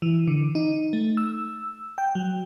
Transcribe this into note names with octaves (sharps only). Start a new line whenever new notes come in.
E3
D3
D#4
A3
E6
G5
F#3